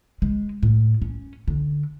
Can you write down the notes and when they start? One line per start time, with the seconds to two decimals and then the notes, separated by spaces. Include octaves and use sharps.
0.22 G#3
0.63 A2
1.02 C#4
1.48 D3